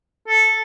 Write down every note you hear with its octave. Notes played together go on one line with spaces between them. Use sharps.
A4